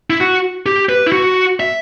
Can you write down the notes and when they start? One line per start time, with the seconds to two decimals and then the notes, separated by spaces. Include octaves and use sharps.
0.10 E4
0.20 F#4
0.66 G4
0.89 B4
1.07 E4
1.12 F#4
1.60 E5